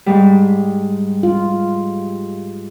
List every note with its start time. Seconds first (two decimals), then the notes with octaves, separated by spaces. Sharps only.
0.06 G#2 G3
1.23 F4